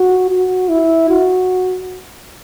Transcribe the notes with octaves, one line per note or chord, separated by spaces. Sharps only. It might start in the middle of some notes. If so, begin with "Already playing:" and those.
Already playing: F#4
F#4
E4
F#4